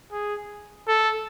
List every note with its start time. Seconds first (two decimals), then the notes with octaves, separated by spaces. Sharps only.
0.12 G#4
0.88 A4